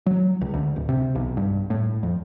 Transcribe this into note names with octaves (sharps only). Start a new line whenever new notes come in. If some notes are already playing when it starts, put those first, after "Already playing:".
F#3
C#2
D2
D1
C3
B1
G2
A2
F2